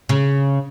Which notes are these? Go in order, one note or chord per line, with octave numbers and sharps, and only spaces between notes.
C#3